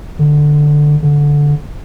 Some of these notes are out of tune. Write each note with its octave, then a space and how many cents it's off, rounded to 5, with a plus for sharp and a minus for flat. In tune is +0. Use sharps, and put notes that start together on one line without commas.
D3 +10
D3 -10